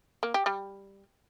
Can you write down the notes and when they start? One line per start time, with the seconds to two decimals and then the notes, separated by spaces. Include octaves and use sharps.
0.23 A#3
0.34 G4
0.46 G3